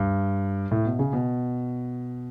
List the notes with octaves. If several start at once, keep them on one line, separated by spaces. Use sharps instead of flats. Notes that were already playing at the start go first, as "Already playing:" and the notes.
Already playing: G2
A2
B2
C#3
B2